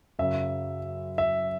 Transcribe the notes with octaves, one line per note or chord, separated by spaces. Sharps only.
F#2 C#3 F#3 C#4 E5
E5